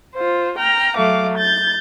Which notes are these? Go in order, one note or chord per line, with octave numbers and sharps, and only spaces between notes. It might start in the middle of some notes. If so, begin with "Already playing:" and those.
F4 C5
G5 A#5 F6
F#3 A3 F5 D6
G6 A6